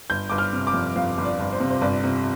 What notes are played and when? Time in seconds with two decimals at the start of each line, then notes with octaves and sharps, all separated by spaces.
0.10 G1 G6
0.29 G1 D6
0.38 F6
0.53 C3
0.67 D6
0.74 F2
0.96 F2 F5
1.17 G1
1.25 D5
1.39 G1
1.52 C5
1.60 C3
1.70 C5
1.81 G1 D5
2.04 C3